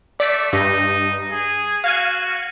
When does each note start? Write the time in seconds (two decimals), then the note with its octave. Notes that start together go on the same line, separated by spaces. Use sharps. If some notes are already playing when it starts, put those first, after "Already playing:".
0.20 A3 D5 B6
0.53 G2 D#4
1.30 G#4
1.84 F#4 F5 G#6 D#7